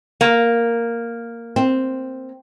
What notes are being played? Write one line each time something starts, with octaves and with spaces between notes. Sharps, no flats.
A#3
C4